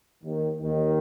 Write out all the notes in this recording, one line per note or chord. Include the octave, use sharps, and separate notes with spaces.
D#2 D#3
D#2 D#3